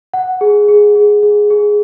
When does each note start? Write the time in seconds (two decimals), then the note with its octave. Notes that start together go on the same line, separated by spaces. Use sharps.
0.13 F#5
0.41 G#4
0.68 G#4
0.95 G#4
1.23 G#4
1.50 G#4